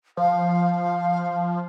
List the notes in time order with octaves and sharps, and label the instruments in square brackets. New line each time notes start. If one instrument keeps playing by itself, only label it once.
[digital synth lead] F3 [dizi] F5